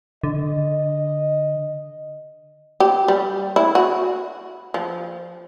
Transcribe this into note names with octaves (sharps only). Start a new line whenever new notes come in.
D3 D#5
G4
G3
E4
F#4
F3